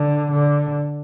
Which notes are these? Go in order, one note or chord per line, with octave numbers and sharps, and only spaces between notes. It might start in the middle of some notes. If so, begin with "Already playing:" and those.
Already playing: D3
D3